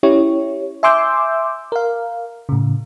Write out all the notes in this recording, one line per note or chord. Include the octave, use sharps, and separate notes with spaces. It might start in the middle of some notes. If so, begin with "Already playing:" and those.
C#4 E4 G4 C#5
E5 G#5 C6 D6 E6 G6
A#4 F5
A2 C#3